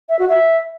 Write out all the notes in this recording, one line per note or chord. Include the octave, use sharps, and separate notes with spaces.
E5
F#4
E5